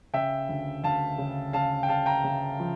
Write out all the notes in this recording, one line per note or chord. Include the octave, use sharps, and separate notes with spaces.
C#3 E5 G5
D2
D2 F5 A5
C#3
C#3 F5 A5
G5
C#3 F5 A5
G5 A#5
C#3
F3